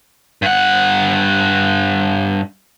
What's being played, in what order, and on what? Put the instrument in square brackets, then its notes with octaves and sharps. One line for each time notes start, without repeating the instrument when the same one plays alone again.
[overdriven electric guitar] G2 F#5